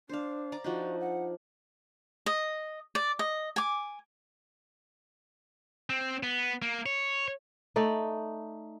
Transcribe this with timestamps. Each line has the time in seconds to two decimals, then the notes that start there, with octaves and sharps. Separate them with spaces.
0.09 D4 C5 F5
0.52 D5 A#5 D6
0.64 F3 D4 D#4 F#4
1.00 F#5
2.26 D#5
2.95 D5
3.19 D#5
3.56 G#5 D6
5.90 C4
6.23 B3
6.62 A#3
6.86 C#5
7.76 A3 D#4 D5